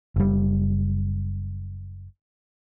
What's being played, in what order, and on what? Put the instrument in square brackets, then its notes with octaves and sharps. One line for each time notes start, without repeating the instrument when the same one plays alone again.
[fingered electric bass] F#1 G3